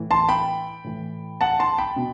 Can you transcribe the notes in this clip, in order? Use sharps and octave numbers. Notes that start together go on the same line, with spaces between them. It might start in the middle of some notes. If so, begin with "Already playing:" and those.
Already playing: A2 E3
A5 C6
G5 B5
A2 E3
F#5 A5
A5 C6
G5 B5
B2